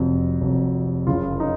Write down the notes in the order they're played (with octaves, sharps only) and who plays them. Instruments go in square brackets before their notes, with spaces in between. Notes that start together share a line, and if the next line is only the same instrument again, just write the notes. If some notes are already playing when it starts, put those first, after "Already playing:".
Already playing: [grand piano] F1 F2 C3 F#3
F1 F2 C3 F#3
F#1 F#2 C#3 F4
D#4